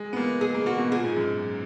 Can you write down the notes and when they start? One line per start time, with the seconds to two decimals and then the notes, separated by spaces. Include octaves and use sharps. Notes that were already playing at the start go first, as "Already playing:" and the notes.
Already playing: G#3
0.13 B3
0.17 A#3
0.41 G#4
0.54 A#3
0.66 A#3 F#4
0.79 B2
0.92 A#2 G#4
1.04 G#2
1.16 F#2